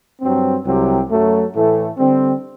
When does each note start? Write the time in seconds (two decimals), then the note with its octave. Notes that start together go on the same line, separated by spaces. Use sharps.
0.21 G2 F#3 C4
0.65 C2 C3 F#3 C4 G4
1.09 F#2 F#3 A3
1.54 A2 E3 A3
1.98 D3 G3 C4